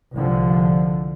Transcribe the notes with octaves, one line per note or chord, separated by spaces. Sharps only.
C2 D3 F3